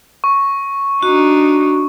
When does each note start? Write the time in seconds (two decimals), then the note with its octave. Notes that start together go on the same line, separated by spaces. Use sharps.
0.24 C#6
1.03 D4 D#4 F#4